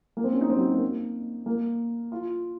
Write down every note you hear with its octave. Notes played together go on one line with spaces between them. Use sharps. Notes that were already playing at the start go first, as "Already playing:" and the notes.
A#3
C4
C#4
D#4
C4
F#3
A#3
A#3
F4